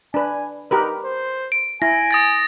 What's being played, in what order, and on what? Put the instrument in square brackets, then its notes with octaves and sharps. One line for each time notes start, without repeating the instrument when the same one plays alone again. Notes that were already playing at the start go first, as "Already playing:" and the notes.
[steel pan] D4 B4 [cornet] G#5
[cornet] D#4 [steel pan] G4 A#4 B4
[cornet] C5
[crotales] D7
[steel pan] E4 [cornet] G#5 [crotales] A#6
[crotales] D#6 A6 A#6